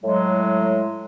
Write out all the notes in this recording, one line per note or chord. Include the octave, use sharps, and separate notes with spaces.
A2 F#3 G#3